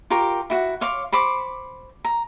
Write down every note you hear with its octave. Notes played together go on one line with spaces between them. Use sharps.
F4 G4 A#4 C#6
E4 F#4 F#5
C#5 F5 C6 D6
C5 B5 C#6 D6
A#5